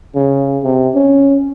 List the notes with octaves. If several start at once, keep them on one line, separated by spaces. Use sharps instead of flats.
C#3
C3
C#4